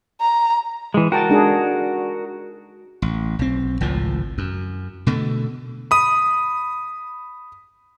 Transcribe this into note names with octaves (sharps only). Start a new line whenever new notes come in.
A#5
E3 G#3
F#4 A#4 G5 A5
G#3 D4 G#4
A1
B1 C4
G#1 C#2 A2 F3
F#2
B2 D3 A3
B5 D#6